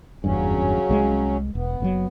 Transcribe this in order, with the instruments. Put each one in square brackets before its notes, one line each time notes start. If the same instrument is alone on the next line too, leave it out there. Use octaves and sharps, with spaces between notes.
[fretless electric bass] F#1 E2 G2 [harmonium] C#3 F#3 C#4
[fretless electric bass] C2 G3 G#3
[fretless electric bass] E1 [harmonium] B3
[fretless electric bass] F#1 B2 F#3